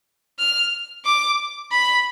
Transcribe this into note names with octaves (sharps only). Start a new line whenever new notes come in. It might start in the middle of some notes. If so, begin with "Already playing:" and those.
F6
D6
B5